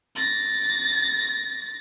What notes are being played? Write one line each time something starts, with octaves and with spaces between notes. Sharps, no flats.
A6 A#6